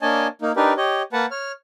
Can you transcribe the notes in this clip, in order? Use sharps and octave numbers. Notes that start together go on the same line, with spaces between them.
A#3 D4 C#5 D#5 G#5 A5
A#3 D#4
D4 D#4 G4 A#4 B4
G4 C#5 D#5
A#3 B4 F#5 A5
C#5 F6